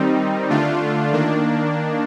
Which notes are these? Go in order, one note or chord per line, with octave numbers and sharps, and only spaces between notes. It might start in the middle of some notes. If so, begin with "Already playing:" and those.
Already playing: D#3 G3 C4 D#4
D3 A3 D4 F4
D#3 A#3 D4